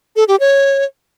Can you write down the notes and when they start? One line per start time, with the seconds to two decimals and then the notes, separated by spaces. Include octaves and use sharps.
0.16 A4
0.28 G4
0.40 C#5